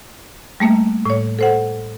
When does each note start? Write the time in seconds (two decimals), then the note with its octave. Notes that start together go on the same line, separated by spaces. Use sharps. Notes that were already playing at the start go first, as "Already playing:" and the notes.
0.60 G3 A3 A#3
1.05 A2 C#5
1.39 A4 C5 F#5